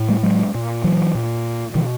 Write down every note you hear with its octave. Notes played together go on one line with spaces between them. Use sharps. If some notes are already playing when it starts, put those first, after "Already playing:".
Already playing: A2
G3 A3
F#3 G#3
A#2
E3 F#3
A#2
B2 D#3 F3